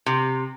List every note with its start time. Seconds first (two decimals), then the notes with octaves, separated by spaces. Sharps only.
0.06 C3